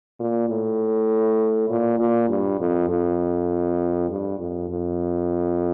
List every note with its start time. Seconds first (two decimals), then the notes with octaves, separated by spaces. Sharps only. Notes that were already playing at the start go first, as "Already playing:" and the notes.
0.19 A#2
0.49 A2
1.69 A#2
1.99 A#2
2.29 G2
2.60 F2
2.89 F2
4.09 G2
4.40 F2
4.70 F2